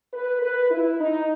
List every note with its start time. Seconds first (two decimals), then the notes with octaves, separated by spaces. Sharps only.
0.14 B4
0.42 B4
0.70 E4
0.99 D#4